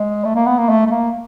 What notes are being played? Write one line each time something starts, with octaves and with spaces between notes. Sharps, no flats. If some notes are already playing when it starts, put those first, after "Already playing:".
Already playing: G#3
A3
A#3
B3
A#3
A3
A3
A#3